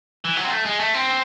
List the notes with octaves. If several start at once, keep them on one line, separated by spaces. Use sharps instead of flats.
E3
F#3
C4
A3
G#3
A3
C4